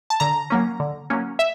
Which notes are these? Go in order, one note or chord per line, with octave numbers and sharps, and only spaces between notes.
A5
D3 A#5
F#3 A#3 C#4
D3
F#3 A#3 C#4
E5